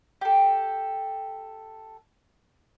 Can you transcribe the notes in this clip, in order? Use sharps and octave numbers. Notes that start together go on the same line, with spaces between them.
G4 A4